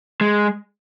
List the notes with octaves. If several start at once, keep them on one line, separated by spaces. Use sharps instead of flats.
G#3